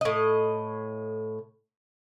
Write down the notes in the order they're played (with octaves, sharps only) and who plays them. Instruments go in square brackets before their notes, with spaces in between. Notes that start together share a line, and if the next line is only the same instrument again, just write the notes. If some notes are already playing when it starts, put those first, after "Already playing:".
[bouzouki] A2 D#5